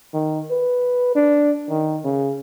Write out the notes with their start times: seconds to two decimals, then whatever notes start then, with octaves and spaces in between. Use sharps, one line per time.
0.14 D#3
0.51 B4
1.15 D4
1.69 D#3
2.04 C#3